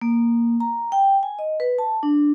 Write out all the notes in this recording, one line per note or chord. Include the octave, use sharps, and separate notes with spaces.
A#3
A#5
G5
G#5
D#5
B4
A5
D4